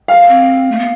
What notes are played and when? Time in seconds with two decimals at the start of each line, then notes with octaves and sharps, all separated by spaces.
0.08 F5
0.28 C4
0.71 A3
0.78 B3